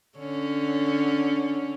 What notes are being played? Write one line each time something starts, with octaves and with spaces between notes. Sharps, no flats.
D3 C#4